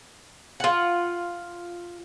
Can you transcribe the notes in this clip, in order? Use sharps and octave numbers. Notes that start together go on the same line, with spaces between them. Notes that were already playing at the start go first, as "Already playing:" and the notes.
F4 F#5